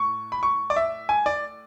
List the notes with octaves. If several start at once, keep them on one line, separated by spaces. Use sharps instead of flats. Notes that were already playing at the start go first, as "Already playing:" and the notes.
Already playing: A2 C#6
B5
C#6
D5
E5
G#5
D5